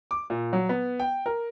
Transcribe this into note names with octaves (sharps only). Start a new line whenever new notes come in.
D6
A#2
F#3
B3
G5
A#4